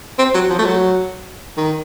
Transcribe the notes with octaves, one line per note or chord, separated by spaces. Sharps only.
C4
F#3
F3
A3
F#3
D#3